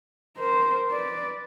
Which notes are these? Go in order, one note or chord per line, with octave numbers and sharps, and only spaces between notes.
A#4 C5
B4 D5